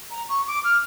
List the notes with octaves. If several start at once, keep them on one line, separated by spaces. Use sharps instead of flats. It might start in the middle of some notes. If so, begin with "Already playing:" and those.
A#5
C#6
D6
F6